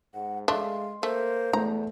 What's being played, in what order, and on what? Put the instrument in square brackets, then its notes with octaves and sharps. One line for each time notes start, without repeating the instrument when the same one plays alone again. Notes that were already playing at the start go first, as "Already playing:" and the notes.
[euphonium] G#2 [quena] F#5
[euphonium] G#3 [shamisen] A3 D4 [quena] F5 [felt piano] C6
[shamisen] A3 [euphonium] A#3 [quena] C5
[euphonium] E2 [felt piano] A3 [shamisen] A#5